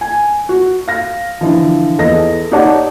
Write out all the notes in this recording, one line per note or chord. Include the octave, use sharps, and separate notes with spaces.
G#5
F#4
F5 A#6
D3 E3 F3
E2 A4 D#5 A#6
D#4 G4 C#5 D5 F#5 A5